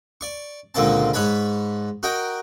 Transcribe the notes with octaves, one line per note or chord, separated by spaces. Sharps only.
D5 C#6
C#2 A#2 D3 A#3 C4 A5
G#2 B4 C#5 A5 B5
F#4 A#4 D#5 G5